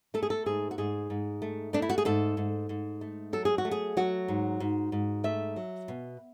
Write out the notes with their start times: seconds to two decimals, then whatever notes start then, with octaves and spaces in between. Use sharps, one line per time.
0.14 A3 A4
0.23 G#4
0.30 A4
0.46 G#2 G#4
0.71 F#4
0.78 G#2 G#4
1.10 G#2
1.42 A3
1.73 A3 D4
1.82 E4
1.89 F#4
1.98 G#4
2.05 G#2 A4
2.37 G#2
2.69 G#2
3.01 A3
3.33 F#3 A4
3.45 G#4
3.58 F#4
3.65 A3
3.71 G#4
3.97 F#3 F#4
4.28 G#2
4.60 G#2
4.92 G#2
5.24 A3 E5
5.56 F#3
5.88 B2